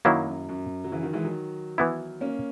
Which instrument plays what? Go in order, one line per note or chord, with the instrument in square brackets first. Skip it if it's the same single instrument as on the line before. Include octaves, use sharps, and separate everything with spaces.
[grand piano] F#2 [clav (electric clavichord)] D#3 F#3 A#3 E4
[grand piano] F#2
F#2
F#3
C#3 E3
D#3 F#3
E3 G#3
D#3 F#3
[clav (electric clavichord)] E3 B3 E4
[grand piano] A#3 C#4